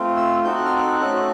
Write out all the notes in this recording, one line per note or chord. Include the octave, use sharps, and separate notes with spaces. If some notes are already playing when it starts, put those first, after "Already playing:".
Already playing: A3 C4 F4
E6
C4 D#4 F#4 A4 G6
F#6
F6
F#6
A3 C#4 F#4 A4